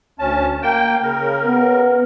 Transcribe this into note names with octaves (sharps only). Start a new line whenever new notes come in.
D2 C#4 A5
A#3 G5
C#3 A#4
B3